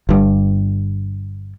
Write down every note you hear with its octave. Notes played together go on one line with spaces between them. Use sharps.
G1 G2